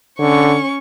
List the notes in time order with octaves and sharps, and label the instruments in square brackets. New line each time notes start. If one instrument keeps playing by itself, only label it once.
[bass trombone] D3 [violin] C#4 C#6